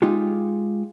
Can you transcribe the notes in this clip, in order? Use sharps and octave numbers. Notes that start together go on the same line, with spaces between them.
G#3 D#4 F4 G4